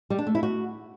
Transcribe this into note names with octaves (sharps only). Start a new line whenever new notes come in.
G3
D4
A3
E4
F#4